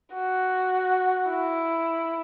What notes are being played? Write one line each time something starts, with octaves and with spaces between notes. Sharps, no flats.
F#4
E4